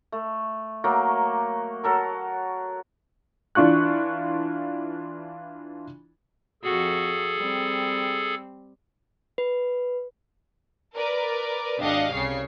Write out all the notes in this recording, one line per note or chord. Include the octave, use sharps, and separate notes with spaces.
A3
F#3 A3 A#3
F#3 A4 A#4
E3 D4 F4 C#6 F#6
F2 F#4 G#4 A4
G3 C4
B4
A#4 B4 D5
G#1 D4 G4 D#5 F5 F#5
C2 C#3 C#5 C7